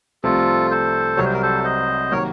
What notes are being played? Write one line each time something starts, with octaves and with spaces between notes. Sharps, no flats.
C2 C3 F3 A3 F4 A4
A4 C5
C2 C3 F#3 C#5
C5
A#4
A4 C5
C5 D#5
C3 D#3 F#3 A#3 A#4 C#5